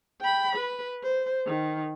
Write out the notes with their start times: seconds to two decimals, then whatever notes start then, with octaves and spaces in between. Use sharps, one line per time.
0.21 G5 B5
0.56 B4
1.03 C5
1.46 D#3